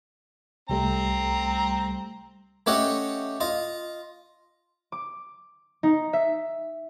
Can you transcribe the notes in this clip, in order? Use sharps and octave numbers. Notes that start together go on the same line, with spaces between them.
C2 G3 A3 C4 A#5
A3 C#4 G4 C#5 D#5 F#5
F4 D#5
D6
D#4
E5